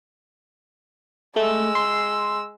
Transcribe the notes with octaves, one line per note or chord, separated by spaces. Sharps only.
G#3 A3 E6
C6